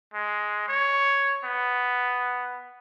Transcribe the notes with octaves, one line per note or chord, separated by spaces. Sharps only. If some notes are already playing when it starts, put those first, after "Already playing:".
G#3
C#5
B3